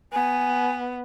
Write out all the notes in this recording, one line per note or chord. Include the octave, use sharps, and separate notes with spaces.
B3 G#5